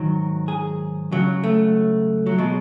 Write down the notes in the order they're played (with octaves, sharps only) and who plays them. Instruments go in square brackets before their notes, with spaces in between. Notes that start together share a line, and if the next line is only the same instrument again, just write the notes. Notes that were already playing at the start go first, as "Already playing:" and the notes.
Already playing: [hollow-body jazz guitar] G#2 D#3 F#3
G#4
C#2 C#3 F#3
A3
F#3
B2 F#3 G#3